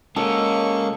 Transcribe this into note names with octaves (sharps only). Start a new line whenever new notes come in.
G#3 A#3 C#4 A4 D#5 C#6